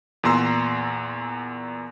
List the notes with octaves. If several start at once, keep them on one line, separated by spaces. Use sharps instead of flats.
E2 A#2 A#5 C6 E6